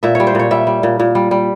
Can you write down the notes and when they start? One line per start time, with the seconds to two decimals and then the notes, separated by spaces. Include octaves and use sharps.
0.03 A#2 E5
0.15 G3 C#5
0.27 C5
0.35 A#2 C#5
0.51 G3 E5
0.67 G3
0.83 A#2
0.99 A#2
1.15 G3
1.31 G3